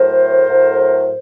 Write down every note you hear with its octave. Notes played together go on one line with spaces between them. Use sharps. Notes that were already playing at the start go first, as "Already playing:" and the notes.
Already playing: A2 F#3 A3 A#4 C5
A2 F#3 A3